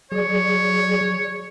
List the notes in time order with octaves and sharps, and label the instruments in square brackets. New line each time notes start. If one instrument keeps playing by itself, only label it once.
[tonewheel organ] F#3 G#4 D5 [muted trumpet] C#5